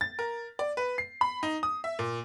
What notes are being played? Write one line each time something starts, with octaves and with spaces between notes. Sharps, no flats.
A6
A#4
D5
B4
C7
B5
D#4
D#6
E5
A#2